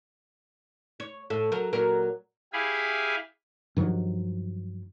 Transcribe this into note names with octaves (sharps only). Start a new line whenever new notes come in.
C#5
A2 A4
F#3 A#4
A#2 F#3 A#4
E4 G4 G#4 F5 G#5 B5
G2 D#3 F3 F#3